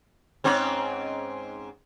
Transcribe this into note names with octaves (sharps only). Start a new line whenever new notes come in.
G#2 C4 C#4